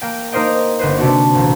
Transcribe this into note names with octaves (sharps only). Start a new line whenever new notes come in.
A#3 G5
A#3 D#4 A#4 C5 D#5 G5
G1 B4 C5
C3 D4 F#4
D#1 A1